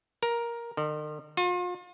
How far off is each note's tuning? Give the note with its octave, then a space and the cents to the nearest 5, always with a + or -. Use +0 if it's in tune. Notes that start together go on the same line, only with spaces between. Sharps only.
A#4 +10
D#3 -45
F4 +40